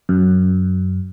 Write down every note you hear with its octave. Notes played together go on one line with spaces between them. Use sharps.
F#2